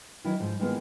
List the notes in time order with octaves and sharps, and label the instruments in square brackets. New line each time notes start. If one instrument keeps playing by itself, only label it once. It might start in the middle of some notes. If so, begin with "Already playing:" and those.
[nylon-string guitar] D#3 E3 F#3 E4
G#2 F3
D#3 E3 G#3 A#3 B3 F4